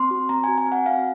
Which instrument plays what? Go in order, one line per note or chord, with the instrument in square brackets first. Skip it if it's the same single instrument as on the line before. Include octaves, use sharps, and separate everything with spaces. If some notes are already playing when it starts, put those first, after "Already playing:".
Already playing: [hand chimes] C4 C6
F#4
C4 A#5
F#4 G#5
G#5
C4
F#5
C4 F5